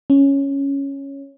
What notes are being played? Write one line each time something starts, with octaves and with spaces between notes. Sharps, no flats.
C#4